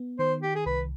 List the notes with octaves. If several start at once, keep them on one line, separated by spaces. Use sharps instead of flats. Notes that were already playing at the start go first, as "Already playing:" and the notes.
Already playing: B3
D#3 C5
G4
G#4
C2 B4